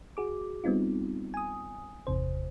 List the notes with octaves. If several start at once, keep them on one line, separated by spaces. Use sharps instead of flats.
F#4 G#4 D6
G3 B3 C4 D#4 F4
G#5 D#6
G1 E2 C3 C5